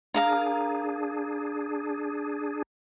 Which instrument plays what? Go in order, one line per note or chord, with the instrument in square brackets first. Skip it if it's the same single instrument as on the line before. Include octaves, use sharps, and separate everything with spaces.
[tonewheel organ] D4 G#4 [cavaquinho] A#4 F5 A#5